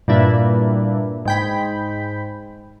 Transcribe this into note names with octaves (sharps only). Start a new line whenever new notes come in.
G2 A#2 D4 E4
G#2 G5 B5